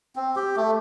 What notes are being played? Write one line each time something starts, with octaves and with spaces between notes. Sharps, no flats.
C4
G4
A3